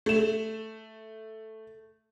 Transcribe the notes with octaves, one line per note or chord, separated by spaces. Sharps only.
A3 E7